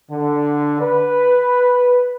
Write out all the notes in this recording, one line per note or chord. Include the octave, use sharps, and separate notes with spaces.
D3
B4